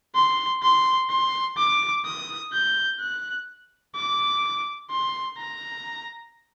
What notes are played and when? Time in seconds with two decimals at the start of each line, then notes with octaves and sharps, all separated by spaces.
0.15 C6
0.62 C6
1.10 C6
1.57 D6
2.05 D#6
2.53 G6
3.00 F#6
3.95 D6
4.91 C6
5.38 A#5